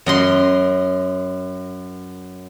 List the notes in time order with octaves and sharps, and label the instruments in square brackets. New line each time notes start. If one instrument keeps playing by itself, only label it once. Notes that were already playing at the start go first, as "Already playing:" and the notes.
[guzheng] F#2 D#5 C6